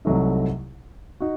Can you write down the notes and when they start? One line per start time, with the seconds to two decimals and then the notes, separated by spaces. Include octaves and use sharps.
0.05 C2 C3 F#3 A3 D#4
1.20 D#4 F#4